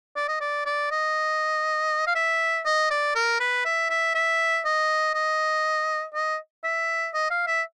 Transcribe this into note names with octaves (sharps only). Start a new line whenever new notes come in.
D5
D#5
D5
D5
D#5
F5
E5
D#5
D5
A#4
B4
E5
E5
E5
D#5
D#5
D#5
E5
D#5
F5
E5